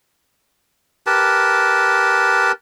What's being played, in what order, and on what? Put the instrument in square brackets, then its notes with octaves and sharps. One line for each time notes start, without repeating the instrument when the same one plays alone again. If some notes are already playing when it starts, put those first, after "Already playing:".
[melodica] G4 A#4 B4 A5